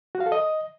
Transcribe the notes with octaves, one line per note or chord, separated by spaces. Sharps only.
F#4
F5
A4
D#5